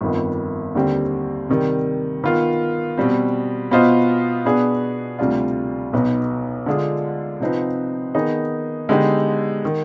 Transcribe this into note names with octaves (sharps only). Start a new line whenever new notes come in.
G1 F2 D#3 B3
D#2 D3 G3 C4 G4
C3 D#3 G3
D#3 B3 F4
B2 G3 C4
B2 B3 F4 C5 D#5
B2 B3 D4 G#4
D2 C3 G3 D4 F4
B1 B2 B3 D#4 B4
D3 G#3 D4 F4 G#4
C3 F3 C4 D#4 B4
D#3 B3 D#4 G#4
D3 G#3 B3 D#4 G4
D#3